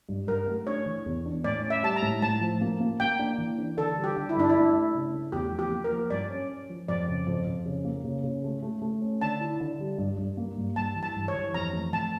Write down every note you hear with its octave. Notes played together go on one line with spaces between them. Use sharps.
G2
G2 A#4
A3
D4 C#5
E3
E2
D4
A2 D5
C#4
E5
G3 A5
A#5
A2
A2 A5
F3
A#3
A#3
A#3 G5
D4
E3
D4
D3 A4
G3
G4
D3
E4
G2 D4
E4
A3
A3
C#3
A3
E2 G4
F3
G4
A#3
A#4
F3
G2 D5
C#4
C#4
F3
F2 D5
C#3
F2
F2
C#3
A#3
C#3
C#3
A3
A3
A3
C#4
D3 A5
E4
D3
G3
G2
G2
A#3
G2
G2 A5
E3
A5
G2
C#5
E3
F2 A#5
A3
F2 A5